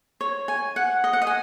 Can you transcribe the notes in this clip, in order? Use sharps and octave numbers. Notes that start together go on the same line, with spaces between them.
C#5
G#5
F#5
D#5
F#5
D#5
G#5